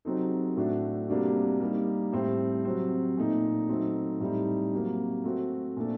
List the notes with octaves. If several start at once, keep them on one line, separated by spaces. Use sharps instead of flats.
C3 F#3 C4 D#4 A4
A2 A3 D4 F#4
C3 G3 A#3 D4 F#4
G3 A#3 D#4
A2 G3 C4 G4
C3 F#3 C4
A#2 A3 D#4
F#3 A3 C4 D#4
A2 G3 C4 D#4
C3 F#3 A#3
A3 C4 F#4
A#2 A3 D4 A4